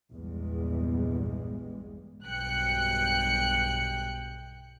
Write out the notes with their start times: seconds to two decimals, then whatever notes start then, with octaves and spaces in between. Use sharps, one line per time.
0.13 A#1 E2 G2 G3 G#3
2.24 B1 G2 G5 F#6 C#7